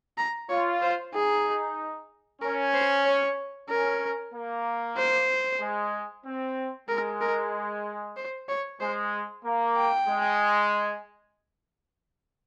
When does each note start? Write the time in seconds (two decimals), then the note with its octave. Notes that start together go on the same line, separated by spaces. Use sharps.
0.18 A#5
0.49 F4 C#5
0.82 C5
1.14 D#4 G#4
2.41 C#4 A#4
2.74 C5
3.06 C#5
3.69 C#4 A#4
4.33 A#3
4.97 C5
5.61 G#3
6.25 C4
6.89 G#3 A#4
7.21 A#4
8.17 C5
8.49 C#5
8.81 G#3 C5
9.45 A#3
9.77 G5
10.08 G#3